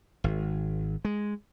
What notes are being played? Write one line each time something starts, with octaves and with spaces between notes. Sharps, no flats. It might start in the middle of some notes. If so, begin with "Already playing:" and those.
G#1
G#3